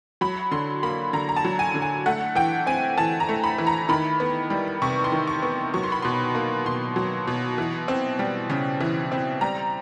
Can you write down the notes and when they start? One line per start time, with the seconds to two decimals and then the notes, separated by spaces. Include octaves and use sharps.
0.21 F#3 B5
0.51 D3 C6
0.83 A#3 B5
1.13 D3 A#5
1.29 A#5
1.36 A5
1.44 F#3
1.59 G#5
1.74 D3
1.82 G#5
2.06 A3 F#5
2.35 E3 G5
2.67 C4 G#5
2.97 E3 A5
3.20 A#5
3.29 A3
3.44 B5
3.58 E3
3.67 A#5
3.89 D#3 B5
4.20 B3
4.50 G3
4.82 C3 C#6
5.04 C6
5.12 D#3
5.27 C#6
5.43 B3
5.74 F#3 C#6
5.83 C6
5.92 B5
6.02 B2 C6
6.35 A#3
6.66 B2 C6
6.96 F#3
7.27 B2
7.58 E3
7.88 C4
8.19 G3
8.50 C#3
8.80 E3
9.12 C4
9.41 G3 A#5